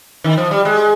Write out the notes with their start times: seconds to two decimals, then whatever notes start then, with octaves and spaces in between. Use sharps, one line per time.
0.24 D#3
0.37 F3
0.51 G3
0.65 G#3